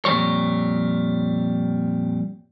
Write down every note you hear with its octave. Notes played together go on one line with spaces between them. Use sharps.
F2 A#2 D#3 G3 C#5